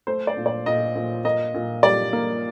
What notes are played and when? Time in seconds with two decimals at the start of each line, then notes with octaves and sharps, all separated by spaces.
0.07 A3 C5
0.27 D5
0.37 A#2
0.46 D5
0.66 A#2 D#5
0.95 A#2
1.25 A#3 D#5
1.54 A#2
1.83 G3 D5
2.13 A#3